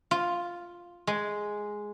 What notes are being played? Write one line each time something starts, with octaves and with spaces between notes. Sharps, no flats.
F4
G#3